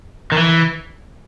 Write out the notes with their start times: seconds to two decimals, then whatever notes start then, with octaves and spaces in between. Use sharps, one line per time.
0.32 D#3
0.37 E3